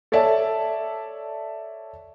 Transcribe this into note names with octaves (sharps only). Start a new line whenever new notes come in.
A4 C#5 D5 E5 A5